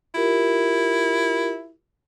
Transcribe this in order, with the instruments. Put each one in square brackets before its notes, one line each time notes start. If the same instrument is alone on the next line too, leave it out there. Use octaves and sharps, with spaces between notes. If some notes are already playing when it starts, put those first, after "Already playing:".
[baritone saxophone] E4 [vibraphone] F4 G4 A#4